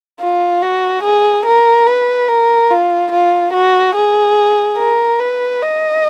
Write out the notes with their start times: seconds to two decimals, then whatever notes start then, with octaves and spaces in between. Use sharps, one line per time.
0.21 F4
0.62 F#4
1.03 G#4
1.46 A#4
1.87 B4
2.28 A#4
2.71 F4
3.12 F4
3.53 F#4
3.96 G#4
4.78 A#4
5.19 B4
5.62 D#5